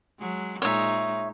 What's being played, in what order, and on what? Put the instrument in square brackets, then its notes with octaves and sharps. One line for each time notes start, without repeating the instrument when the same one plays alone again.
[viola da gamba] F#3 G#3
[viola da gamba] A#2 G#3 D#4 [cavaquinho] C#5 E5